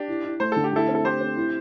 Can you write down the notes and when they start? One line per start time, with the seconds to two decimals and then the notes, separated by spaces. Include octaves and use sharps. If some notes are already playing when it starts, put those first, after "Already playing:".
Already playing: D4 G4
0.08 E4
0.24 E4
0.40 A3 C5
0.52 D3 A4
0.64 G4
0.72 A3 E4 A4
0.88 C4
0.95 A4
1.05 A3 G4 C5
1.21 C4
1.36 E4